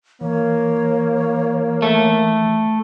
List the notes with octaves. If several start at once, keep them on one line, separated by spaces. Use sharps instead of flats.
E3 A#3 C#5
A3